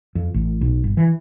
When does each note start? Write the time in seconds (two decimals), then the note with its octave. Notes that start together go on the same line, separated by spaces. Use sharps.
0.15 F2
0.34 A1
0.61 B1
0.84 G1
0.97 E3